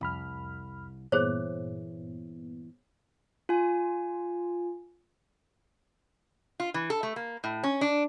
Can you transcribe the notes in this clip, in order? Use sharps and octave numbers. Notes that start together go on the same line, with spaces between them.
C2 F2 B5 F6
G2 A#2 E3 B3 G#4 C5 C#5
F4 G#5
F4
E3
A4
A3
A#3
A2
C#4
D4